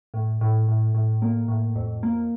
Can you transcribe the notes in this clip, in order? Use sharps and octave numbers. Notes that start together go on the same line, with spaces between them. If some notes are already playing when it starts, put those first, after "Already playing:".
A2
A2
A2
A2
A#3
A2
F2
A#3